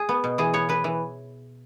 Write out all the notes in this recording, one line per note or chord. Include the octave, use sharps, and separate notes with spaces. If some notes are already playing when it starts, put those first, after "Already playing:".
Already playing: G#4
B3
B2
E3 G#4
B3 C#5
E3 B4
E3